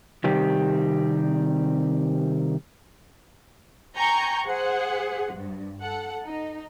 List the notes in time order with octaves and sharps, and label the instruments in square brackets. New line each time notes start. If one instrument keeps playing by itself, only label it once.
[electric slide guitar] C3 D#3 G3 C4 G4
[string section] G5 G#5 A#5 C#6 G6
G#4 C5 F#5
G2
A4 F#5
D#4